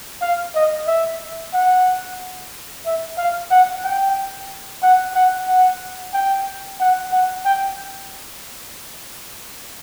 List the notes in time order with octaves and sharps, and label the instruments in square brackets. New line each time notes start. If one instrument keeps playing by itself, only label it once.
[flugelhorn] F5
D#5
E5
F#5
E5
F5
F#5
G5
F#5
F#5
F#5
G5
F#5
F#5
G5